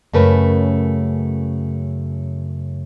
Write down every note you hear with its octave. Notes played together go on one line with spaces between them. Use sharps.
F#2 C#3 A3 A#4 B4